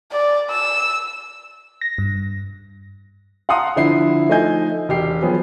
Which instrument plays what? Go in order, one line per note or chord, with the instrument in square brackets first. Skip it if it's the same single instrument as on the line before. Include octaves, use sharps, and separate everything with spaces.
[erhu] D5
E6
[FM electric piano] A#6
G2
[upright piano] F5 F#5 A5 A#5 C6 D#6
D3 F3 E4 C7
F3 A3 D#4 D#5 G#5 G6
E1 G4 C7
F3 F#3 B3 G#4